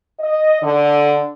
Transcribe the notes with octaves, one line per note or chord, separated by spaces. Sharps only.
D#5
D3